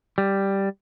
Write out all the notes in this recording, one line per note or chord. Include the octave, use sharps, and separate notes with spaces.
G3